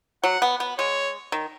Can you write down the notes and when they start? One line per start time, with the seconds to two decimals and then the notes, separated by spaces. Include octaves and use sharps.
0.24 F#3 F#5
0.42 B3
0.60 B3
0.79 G#3 C#5
1.32 D#3